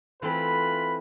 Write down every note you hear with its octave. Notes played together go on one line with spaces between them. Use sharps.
E3 A3 C4 F4 B4 B5